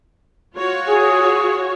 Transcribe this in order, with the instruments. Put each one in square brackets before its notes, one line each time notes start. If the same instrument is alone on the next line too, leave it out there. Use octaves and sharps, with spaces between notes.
[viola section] F4 F#4 C#5
[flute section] G#4